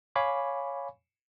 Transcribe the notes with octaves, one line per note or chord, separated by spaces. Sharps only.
C#5 F5 G#5 B5 C#6 D6